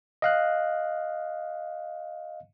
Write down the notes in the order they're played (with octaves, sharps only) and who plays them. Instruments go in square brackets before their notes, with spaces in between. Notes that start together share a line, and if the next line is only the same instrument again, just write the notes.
[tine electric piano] D#5 F5 F#6